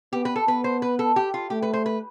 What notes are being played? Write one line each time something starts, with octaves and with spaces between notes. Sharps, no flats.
B3 G4
B4
A4
B3 B4
C5
B4
A4
G4
F4
A3 G4
B4
C5
B4